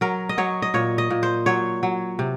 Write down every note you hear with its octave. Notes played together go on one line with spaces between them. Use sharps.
F#3 A#4
D#5
F#3 C#5
D#5
A#2 C#5
D#5
A#2
C5
F#3 C#5
F#3
C3